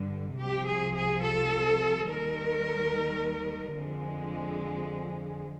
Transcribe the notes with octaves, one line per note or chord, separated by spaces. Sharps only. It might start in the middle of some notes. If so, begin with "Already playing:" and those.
Already playing: G2 D3 G3
C2 C3 F3 G4
G#4
G#4
A4
D#2 D#3 G3 A#4
F2 D3 F3 G#3